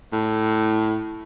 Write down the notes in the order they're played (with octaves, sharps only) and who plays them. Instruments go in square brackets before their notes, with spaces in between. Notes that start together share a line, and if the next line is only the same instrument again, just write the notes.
[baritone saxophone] A2